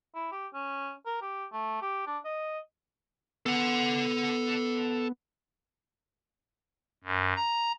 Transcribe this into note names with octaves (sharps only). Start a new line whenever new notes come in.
E4
G4
C#4
A#4
G4
A3
G4
D4
D#5
B3 A4 F#5
F#2
A#5